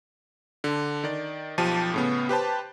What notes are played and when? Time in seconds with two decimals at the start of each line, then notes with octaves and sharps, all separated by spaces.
0.64 D3
1.04 D#3 D5
1.58 B1 F3 G4 A5 D#7
1.94 A2 C#3 B3
2.29 G4 B4 C5 A5